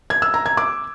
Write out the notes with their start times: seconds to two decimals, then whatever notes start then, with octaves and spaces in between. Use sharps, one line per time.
0.10 G#6
0.22 E6
0.34 A#5
0.46 G#6
0.57 D6